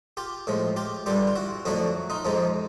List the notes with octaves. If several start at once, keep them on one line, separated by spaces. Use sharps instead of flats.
F4 G4
A2 F3 G#3
F4 G4
G2 D3 G3 F4 G4
F4
E4 F#4
F2 D3 F#3 A3 E4 F#4
D#4 F4
F2 C3 F3 G#3